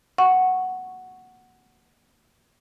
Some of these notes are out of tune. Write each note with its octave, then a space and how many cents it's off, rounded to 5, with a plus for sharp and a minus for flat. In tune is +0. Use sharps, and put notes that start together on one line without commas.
F#5 +0 C#6 +0